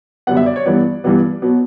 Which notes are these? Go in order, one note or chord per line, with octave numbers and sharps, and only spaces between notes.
F#2 D3 G3 B3 F#5
E5
D5
C#5
G2 E3 G3 B3 D5
G2 E3 G3 B3
B2 F#3 B3